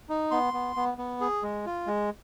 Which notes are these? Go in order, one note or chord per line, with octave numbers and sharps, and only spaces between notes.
D#4
B3 C6
B3
B3
B3
G#4
G#3
F4
G#3